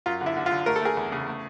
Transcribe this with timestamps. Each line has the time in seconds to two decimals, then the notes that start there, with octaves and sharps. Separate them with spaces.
0.06 F#2 F4
0.21 D3
0.26 E4
0.36 D3
0.46 F4
0.51 D3
0.66 A3 A#4
0.76 A4
0.82 A3 G#4 A#4
0.97 E2
1.12 C#3
1.27 A3